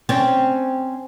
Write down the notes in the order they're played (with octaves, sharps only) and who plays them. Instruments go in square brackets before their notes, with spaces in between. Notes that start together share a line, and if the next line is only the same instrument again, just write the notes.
[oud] C4 C#4